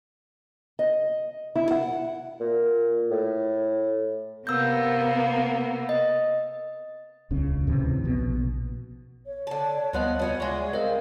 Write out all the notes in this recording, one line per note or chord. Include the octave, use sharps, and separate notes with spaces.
D#5
E4
F#5
A#2
A2
C3 A#3 B3 E6 G6
D#5
D#1 C#2 C#3 C#4
D2 A2 C3 E3
A#1 B2
C#5
D3 A5
D2 F3 G3 B3 D#5 F#5
B3 C#4 F4 F#4
F#3 G#3 G#4 C#5 D5 E5 F#5
C4 A#4 D#5 F5